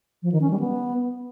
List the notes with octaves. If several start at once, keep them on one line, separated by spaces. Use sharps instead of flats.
F3
D#3
C#4
G3
B3